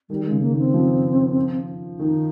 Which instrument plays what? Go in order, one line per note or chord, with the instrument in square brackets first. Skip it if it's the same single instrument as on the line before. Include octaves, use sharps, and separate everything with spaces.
[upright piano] D#3 [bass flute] G3
[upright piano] C#3 [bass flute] G#3
[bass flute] A#3
[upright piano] D#3 [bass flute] C4
[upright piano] F3
[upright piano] D#3 [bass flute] D#4